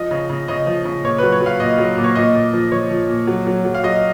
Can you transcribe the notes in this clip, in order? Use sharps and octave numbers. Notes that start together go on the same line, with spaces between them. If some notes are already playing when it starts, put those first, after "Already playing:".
Already playing: F3 D#5
C#3
C#3
C#3 D#5
F3
C#3
A#2 C#5
F#3 B4
C#5
F#3
F5
A#2 D#5
F#3
A#2
C#5
A#2 D#5
A#2
F3
F3 C#5
F3
A#2
F#3
F#3
F#3
F5
F#3 D#5